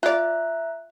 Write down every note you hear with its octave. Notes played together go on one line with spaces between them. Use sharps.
F4 D5 E5 A#5 F#6